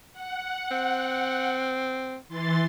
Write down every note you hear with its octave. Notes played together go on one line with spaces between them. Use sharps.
F#5
C4
E3 C6 A6